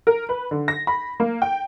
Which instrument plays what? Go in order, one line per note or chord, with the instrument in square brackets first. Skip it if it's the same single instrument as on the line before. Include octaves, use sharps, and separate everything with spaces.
[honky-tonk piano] A#4
B4
D3
A#6
B5
A#3
G5